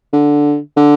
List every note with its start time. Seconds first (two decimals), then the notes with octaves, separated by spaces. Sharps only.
0.13 D3
0.77 D3